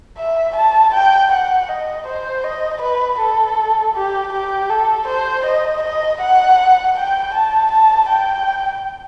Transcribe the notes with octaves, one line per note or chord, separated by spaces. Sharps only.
E5
A5
G5
F#5
D#5
C5
D#5
B4
A4
G4
G4
A4
C5
D#5
D#5
F#5
G5
A5
A5
G5